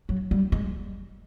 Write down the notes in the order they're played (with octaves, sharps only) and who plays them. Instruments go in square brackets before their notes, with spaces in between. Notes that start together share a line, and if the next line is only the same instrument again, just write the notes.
[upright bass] F#3
G3
G#3